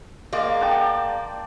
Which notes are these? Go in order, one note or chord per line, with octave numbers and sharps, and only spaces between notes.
G#3 A#3 D5
D5 G5 A5